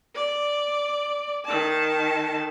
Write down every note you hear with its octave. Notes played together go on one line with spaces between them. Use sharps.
D5
D#3 A5